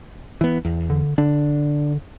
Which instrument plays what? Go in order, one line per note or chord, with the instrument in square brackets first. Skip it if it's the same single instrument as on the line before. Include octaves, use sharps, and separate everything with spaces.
[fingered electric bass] E3 B3
E2
[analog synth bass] D3
[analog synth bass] D3 [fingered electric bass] D4